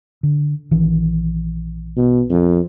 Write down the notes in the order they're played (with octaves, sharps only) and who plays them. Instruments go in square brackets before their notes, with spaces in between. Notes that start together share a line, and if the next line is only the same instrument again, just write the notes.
[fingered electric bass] D3
A#1 D#3 E3
[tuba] B2
F2